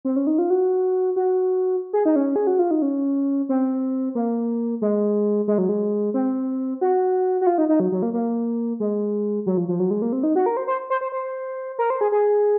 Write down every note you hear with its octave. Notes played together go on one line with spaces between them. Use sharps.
C4
C#4
D#4
F4
F#4
F#4
G#4
D#4
C#4
G#4
F#4
F4
D#4
C#4
C4
A#3
G#3
G#3
F#3
G#3
C4
F#4
F#4
F4
D#4
D#4
F#3
F#3
A#3
A#3
G#3
F#3
F3
F3
F#3
G#3
A#3
C4
D#4
F#4
A#4
C5
C5
C5
C5
C5
A#4
C5
G#4
G#4